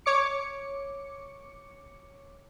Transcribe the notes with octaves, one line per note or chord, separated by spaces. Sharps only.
C#5 D6 C#7